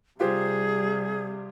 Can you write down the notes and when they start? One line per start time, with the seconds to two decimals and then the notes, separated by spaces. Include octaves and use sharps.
0.20 C3 G3 F4 G4 G#4 C5